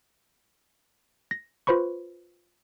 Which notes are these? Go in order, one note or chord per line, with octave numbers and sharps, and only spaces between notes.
A#6
F4 B4 C5 B5 C#6